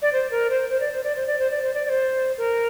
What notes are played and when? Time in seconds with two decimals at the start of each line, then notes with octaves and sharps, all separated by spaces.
0.02 D5
0.13 C5
0.31 A#4
0.50 C5
0.69 C5
0.80 D5
0.92 C5
1.04 D5
1.16 C5
1.27 D5
1.39 C5
1.51 D5
1.62 C5
1.74 D5
1.86 D5
1.89 C5
2.37 A#4